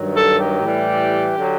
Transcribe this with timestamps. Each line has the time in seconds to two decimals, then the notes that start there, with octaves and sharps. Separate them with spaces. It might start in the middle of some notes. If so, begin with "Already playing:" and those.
Already playing: G2 D#3 F#3
0.14 A4
0.38 G4
0.62 A2 E3 G3
1.37 D3 F#3